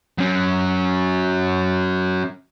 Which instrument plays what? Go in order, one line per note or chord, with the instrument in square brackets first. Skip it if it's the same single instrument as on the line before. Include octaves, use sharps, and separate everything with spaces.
[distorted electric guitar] F#3 C#4